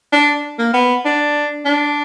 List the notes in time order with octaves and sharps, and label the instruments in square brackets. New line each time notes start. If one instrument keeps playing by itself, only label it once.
[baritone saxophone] D4
A#3
B3
D4
D4